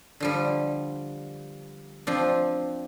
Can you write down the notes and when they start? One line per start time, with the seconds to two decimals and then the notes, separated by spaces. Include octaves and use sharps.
0.20 D3 F3 G3
2.07 F3 C4 D4